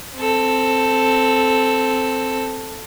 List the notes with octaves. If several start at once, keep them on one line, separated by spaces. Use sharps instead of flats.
C4 A4